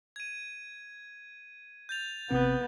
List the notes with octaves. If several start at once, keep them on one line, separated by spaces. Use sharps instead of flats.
G#6 D#7
G6 A6 F7
G#1 C3 B3 C4